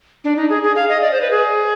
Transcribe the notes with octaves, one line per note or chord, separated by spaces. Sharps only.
D4
D#4
G#4
G#4
F5
D#5
D5
C5
B4
G#4